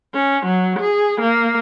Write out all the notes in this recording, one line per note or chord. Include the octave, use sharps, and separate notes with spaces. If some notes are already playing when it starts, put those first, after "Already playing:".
C#4
F#3
G#4
A#3